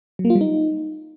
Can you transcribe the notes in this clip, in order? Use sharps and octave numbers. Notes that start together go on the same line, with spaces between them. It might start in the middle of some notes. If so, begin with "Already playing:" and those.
F#3
A#3
F4
G3
D#4